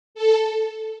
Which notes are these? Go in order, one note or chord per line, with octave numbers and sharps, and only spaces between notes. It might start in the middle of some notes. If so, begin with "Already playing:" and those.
A4